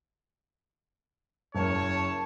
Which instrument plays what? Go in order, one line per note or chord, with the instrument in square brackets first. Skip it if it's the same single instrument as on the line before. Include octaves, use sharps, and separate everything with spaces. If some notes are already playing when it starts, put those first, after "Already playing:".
[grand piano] F#1 A#4 [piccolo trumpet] C#5 [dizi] A5